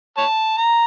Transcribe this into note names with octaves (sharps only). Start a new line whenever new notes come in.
C#5 A5
A#5